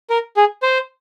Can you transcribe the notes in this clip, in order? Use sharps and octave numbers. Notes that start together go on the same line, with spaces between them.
A#4
G#4
C5